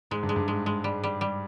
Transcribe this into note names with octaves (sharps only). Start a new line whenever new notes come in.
G#2 G#3
G2
G#3
G2
G#2 G#3
G#3
G3
G3
G3